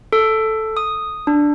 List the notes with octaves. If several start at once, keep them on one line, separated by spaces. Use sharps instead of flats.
A4
D#6
D4